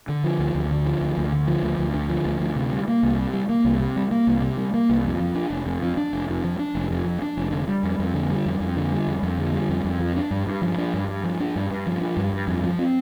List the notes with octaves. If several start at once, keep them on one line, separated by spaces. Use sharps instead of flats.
D3
F3
D2
D2
D3
F3
D2
D2
D3
F3
D2
D2
D3
F3
D2
D2
C3
G3
A#3
C2
C3
G3
A#3
C2
C3
G3
A#3
C2
C3
G3
A#3
C2
F2
F3
D4
F1
F2
F3
D4
F1
F2
F3
D4
F1
F2
F3
D4
F1
D3
G3
F2
F2
D3
G3
F2
F2
D3
G3
F2
F2
D3
G3
F2
F2
F3
D4
G2
G2
F3
D4
G2
G2
F3
D4
G2
G2
F3
D4
G2
G2
F2
F3
C4